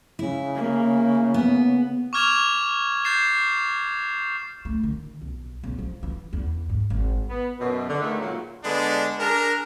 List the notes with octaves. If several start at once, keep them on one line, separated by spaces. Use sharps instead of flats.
C#3 E4
A#3
B3
C#6 D6 F6 G#6 E7 F7
G6 A6 C7 E7
A3
D#3
B1
B1
F3
E3
E2
G#2
G#1
B3
F#2 B2
D3
D#3 E3 G#3 A3
A#2 C#3 F#3
D3 G#3 B3 D4
D4 G#4 A#4